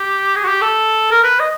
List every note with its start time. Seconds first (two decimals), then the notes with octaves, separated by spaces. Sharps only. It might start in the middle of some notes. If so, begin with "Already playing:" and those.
Already playing: G4
0.36 G#4
0.44 F#4
0.48 G4
0.62 A4
1.12 A#4
1.24 B4
1.40 D#5